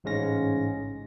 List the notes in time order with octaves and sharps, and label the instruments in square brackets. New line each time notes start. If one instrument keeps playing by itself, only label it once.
[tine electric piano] A1 G#2 C#3 G#3 C#4 A#6